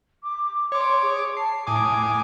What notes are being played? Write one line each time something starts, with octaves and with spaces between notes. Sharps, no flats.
D6
C#5 C6 D6
G#4
A5 C7
A2 G#5 D6 D#6